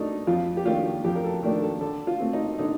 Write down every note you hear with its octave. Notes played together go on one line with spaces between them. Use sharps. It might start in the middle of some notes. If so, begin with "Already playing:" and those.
Already playing: A3 D4 D#4
F2 F4
G4
D#3 A3 D4 F4
F2 G4
A#4
A4
D#3 A3 D4 A#4
A4
D3 A4
F4
A3 C4
D#4
D3 D#4